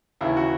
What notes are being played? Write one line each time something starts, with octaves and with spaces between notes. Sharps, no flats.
D#2 C#3 E3 E4
F#4